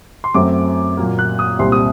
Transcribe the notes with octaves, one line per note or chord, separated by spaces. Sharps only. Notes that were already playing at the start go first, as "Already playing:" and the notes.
C6
F#2 F#3 A3 C4 D6
A#2 F#3 A#3
F#6
D#6
C2 A#2 G3 C4 C6
D#6